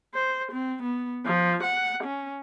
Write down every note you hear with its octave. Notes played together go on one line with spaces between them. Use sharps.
C5
C4
B3
F3
F#5
C#4